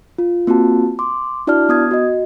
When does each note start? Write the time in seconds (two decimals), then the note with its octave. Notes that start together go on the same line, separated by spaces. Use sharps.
0.19 F4
0.47 A#3 C4 F4 F#4 A5
0.99 C6 D6
1.47 D4 E4 F#4 D5 A5 F6
1.69 B3 D#6 G#6
1.91 F#4 D#5